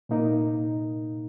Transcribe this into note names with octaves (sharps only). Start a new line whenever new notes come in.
A#2 A#3 D#4 A#4